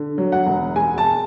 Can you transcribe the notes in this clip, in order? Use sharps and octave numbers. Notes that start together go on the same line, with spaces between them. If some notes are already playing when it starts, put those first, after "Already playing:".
Already playing: D3
F#3
F#5
E1
G#3 G#5
A5